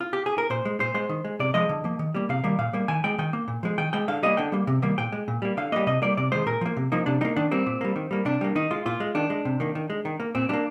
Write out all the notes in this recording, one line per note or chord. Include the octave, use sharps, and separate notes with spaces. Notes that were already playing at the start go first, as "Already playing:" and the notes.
F4
G4
G#4
A#4
A#2 C5
G#3
A#2 C5
G#3 C5
D#3
G#3
C3 D5
F3 G#3 D#5
D3
F3 A#3
D#3
G3 A#3
C3 F5
D#3 G3 A#3
A#2 F5
G3 A#3
D#3 G#5
G#3 G5
D#3 G5
A#3
A#2
F3 G#3
D#3 G5
G#3 G5
D3 F5
G3 A#3 D#5
D3 G5
G3 A#3
C3
D#3 G3 A#3
A#2 G5
G#3
A#2
G3 A#3
D3 F5
G3 A#3 D#5
C3 D#5
G3 A#3 D5
C3 D5
D#3 G#3 C5
A#2 A#4
F3 A#3
C3
F3 A#3 D#4
C3 D4
G3 A#3 D#4
D#3 D4
G3 A#3 C4
A#2
G3 A#3
D#3
G3 A#3
C3 D4
G3 A#3
D#3 D#4
G#3 F4
A#2 F4
G#3
D#3 D4
G#3
C3
D#3 A#3
D#3
G#3
D#3
A#3
A#2 C4
G3 A#3 D4